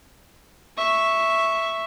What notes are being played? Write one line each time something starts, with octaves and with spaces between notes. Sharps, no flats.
E5 C#6